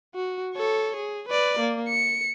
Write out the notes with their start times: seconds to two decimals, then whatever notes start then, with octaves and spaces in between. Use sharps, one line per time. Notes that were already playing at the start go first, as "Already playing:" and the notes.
0.15 F#4
0.54 A4 C#5
0.97 G#4
1.29 B4 D5
1.60 A#3
1.89 C#7